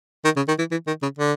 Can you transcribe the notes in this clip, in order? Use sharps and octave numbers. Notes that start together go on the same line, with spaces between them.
D#3
C#3
D#3
E3
E3
D#3
C#3
D3